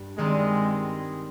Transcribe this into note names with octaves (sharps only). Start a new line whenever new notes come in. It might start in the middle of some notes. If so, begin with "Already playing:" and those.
Already playing: G2
D#3 G3 G#3 C4 D#4